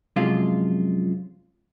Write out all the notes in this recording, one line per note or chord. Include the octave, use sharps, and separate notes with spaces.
F#2 C3 F3 G#3 F4